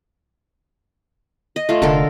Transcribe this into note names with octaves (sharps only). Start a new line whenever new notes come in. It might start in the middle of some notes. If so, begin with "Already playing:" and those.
D#5
A3 F4
F1 D3 A4 A#4